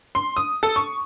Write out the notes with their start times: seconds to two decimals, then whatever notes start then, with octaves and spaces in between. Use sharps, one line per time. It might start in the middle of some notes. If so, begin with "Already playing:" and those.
0.15 C6
0.37 D#6
0.63 A4
0.76 C#6